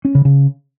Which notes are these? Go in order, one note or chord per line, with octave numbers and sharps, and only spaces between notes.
C#4
C#3
C#3